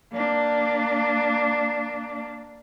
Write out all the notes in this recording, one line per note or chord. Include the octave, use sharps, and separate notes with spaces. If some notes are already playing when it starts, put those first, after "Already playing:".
A#3 D4